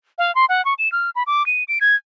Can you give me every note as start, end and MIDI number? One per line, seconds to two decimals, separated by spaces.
0.18 0.34 77
0.35 0.46 84
0.49 0.64 78
0.65 0.74 85
0.79 0.91 100
0.92 1.10 89
1.16 1.23 83
1.27 1.45 86
1.46 1.64 99
1.68 1.79 98
1.81 1.96 92